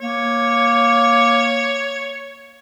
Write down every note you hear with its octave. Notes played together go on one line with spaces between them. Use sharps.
A#3 C#5